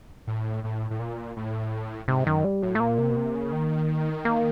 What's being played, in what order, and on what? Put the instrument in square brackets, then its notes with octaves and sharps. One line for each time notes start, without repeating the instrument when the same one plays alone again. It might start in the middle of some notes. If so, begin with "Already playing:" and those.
[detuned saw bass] A2
A2
A2
A#2
A2
[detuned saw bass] G#2 [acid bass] C3
[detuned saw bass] F#2 [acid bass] D#3
[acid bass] G3
[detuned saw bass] A2 [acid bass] F#3
[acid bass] A3
[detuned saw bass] A#2 [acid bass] A#3
[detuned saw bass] C3
B2
C3
C#3
D#3
[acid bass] A#3